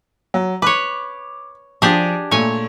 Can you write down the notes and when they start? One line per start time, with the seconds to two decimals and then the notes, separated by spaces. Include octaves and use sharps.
0.34 F#3
0.62 B4 C#5 D6
1.82 F3 D4 G4 G#4
2.31 A#2 A3 C#5 G#5